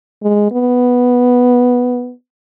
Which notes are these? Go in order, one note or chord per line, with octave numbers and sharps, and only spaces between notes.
G#3
B3